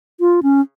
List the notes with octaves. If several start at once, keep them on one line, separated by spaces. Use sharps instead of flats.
F4
C#4